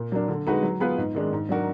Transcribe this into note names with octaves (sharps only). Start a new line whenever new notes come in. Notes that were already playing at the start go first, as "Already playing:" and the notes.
Already playing: A#2
F#3 A#3 D4
D3
G#3 D#4 F#4 B4
F#3
B3 F4 G#4 B4
G#2
D#3 G#3 D4
G#2
F#3 D4 F#4 A#4